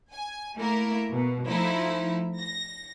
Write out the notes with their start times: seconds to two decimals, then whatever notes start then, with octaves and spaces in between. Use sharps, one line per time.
0.11 G#5
0.56 A3 A#3 E4 A#4
1.12 B2
1.46 F3 A3 D#4 E4
2.40 A#6